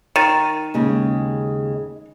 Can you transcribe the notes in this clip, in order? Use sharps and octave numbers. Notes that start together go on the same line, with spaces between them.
D#3 A6 D#7 E7
D#2 C#3 G#3